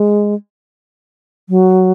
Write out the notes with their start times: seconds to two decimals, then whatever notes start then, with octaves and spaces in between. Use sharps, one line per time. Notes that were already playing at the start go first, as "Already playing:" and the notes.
Already playing: G#3
1.49 F#3